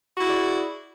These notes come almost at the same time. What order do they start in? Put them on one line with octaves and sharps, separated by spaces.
F#4 E4 G#4 D5